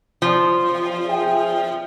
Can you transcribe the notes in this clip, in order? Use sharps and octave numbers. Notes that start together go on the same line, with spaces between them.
F3
G#4 E5 G5